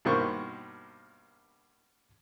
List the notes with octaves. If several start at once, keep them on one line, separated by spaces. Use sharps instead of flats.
G2 B2 D#3 A#3 C5 C#6